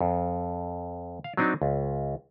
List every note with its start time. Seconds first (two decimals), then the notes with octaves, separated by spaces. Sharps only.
0.01 F2
1.24 F5
1.37 F#3 C4 D4 D#4
1.62 C#2